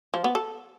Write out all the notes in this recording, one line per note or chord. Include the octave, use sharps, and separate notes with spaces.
F3
B3
A4